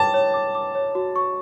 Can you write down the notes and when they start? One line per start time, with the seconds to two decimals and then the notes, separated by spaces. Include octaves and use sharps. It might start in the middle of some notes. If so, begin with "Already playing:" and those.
Already playing: C#5 G5 A5 D6
0.14 C#5
0.34 D6
0.55 D6
0.75 C#5
0.95 F#4
1.16 C#6